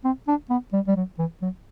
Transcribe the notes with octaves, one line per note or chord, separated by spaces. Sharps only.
C4
D4
B3
G3
G3
F#3
E3
F#3